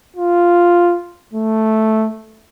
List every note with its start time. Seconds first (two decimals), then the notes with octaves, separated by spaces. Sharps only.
0.16 F4
1.33 A3